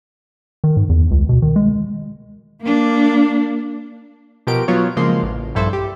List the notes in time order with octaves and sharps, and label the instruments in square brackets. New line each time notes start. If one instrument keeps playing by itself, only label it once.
[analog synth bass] D#3
G#2
E2
C#2
B2
D#3
G#3
[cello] A#3 D4
[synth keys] B2 F3 G4 A#4 D7
F#3 B3 F4 C#5
C#3 F3 G#3 A#3 C6
A1
A#1 G2 E4 A4 C5
G4